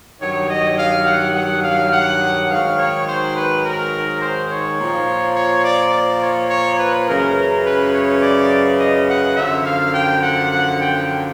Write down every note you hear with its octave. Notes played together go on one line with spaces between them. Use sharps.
G2 D#3 F#3 C#5
D#5
F5
F#5
F#5
F5
F#5
G#2 D#3 F#3 F5
C#5
C5
B4
A#4
C5
C#5
A#2 F3
C#5
D5
D5
C#5
C#5
B4
F#2 C#3 E3 A#4
B4
C#5
D5
D#5
F#5
F#2 D3 F3 E5
F5
G5
F#5
F#5
G5